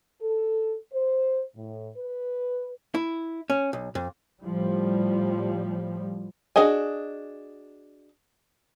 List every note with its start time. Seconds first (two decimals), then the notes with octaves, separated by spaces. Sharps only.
0.21 A4
0.92 C5
1.56 A2
1.97 B4
2.95 E4
3.50 C#4
3.73 B1
3.95 F2
4.43 A2 F3 G3
6.56 D4 F#4 G#4 D#5 G#5